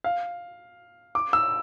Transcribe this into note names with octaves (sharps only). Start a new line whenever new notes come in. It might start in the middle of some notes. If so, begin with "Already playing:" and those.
F5
D6
E6